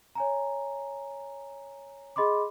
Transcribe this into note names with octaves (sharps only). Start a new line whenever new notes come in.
C#5 G#5 A#5
G#4 D#5 B5 C6 D6